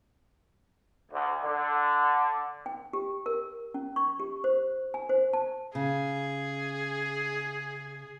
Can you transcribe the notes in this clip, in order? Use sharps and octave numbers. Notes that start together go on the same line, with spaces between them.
D2
D3
G5
G4
A#4
C#4
C#6
G4
C5
G#5
C5
A5
C#3 G#4